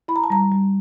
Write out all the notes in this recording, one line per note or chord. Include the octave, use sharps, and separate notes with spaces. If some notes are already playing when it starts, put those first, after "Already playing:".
E4 B5
A#5
A5
G3 A#5
G3